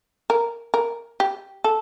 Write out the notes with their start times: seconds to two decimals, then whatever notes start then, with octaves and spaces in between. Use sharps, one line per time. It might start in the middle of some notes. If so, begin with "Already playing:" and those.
0.30 A#4
0.74 A#4
1.20 G4
1.64 A4